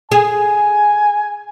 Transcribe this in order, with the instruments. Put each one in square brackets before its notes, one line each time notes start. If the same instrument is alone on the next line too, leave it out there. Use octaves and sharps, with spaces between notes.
[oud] G#4 [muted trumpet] G#5